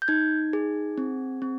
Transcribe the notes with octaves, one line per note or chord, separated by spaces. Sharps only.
G6
D#4 G#6
G#4
C4
C4